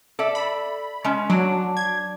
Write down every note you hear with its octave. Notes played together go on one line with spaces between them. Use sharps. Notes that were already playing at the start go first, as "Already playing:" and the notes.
A4 D5 E5
B5
G#3 C#4
F#3 D4
G#6